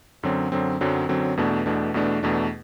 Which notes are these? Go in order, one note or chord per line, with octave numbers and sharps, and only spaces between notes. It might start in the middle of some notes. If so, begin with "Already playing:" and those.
F#2 D3 F#3 C4
F#2 D3 F#3 C4
F#2 D3 F#3 C4
F#2 D3 F#3 C4
E2 B2 A3 D4
E2 B2 A3 D4
E2 B2 A3 D4
E2 B2 A3 D4